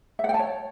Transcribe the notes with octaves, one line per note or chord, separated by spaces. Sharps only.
E5
F#5
G5
A5
C#5